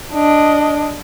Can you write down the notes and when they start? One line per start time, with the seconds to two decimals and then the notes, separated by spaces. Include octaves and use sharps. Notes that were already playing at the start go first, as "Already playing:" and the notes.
0.14 D4 D#5